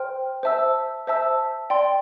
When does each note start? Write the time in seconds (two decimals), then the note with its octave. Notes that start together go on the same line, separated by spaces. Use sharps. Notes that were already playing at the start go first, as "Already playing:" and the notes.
Already playing: C5 G5 C6 F6
0.43 C5 E5 A5 E6
1.07 C5 E5 A5 E6
1.70 D5 G5 C6